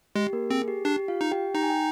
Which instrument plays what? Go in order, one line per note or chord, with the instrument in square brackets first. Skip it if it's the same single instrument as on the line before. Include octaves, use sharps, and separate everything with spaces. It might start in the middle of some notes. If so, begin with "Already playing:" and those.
[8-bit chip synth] G#3 [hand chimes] G4
[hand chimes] A#3 A#4
[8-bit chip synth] C4 [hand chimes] G#4
[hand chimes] G4
[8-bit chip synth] D4 [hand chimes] G4
[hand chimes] F4 F5
[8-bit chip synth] D#4
[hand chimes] G4 G5
[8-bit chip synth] D#4 [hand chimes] A#5
[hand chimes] G#5
G5